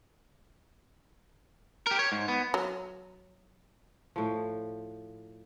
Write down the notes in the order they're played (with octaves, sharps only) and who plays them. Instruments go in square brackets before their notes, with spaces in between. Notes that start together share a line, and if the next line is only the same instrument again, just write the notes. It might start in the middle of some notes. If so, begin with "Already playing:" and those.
[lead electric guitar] G4 A#4
C#5
G#2
B3
[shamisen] F#3
[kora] A2 F3